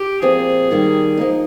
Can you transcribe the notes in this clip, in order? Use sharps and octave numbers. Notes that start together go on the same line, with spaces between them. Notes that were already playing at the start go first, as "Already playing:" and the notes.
Already playing: G4
A#2 F3 C4 G#4
D#3 G3 A#3
F3 A#3 D#4